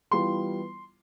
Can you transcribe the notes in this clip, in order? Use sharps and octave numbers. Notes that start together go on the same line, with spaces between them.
E3 G3 B3 F4 C6